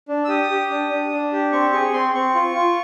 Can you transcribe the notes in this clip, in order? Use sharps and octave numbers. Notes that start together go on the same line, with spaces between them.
D4
E6
G4 D#6
G4
D4
D4
D4
G4
C4 C#6
G#4 C#6
C4 C6
C4 C#6
F4
F4